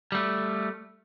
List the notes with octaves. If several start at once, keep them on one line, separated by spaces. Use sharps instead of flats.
G3 A3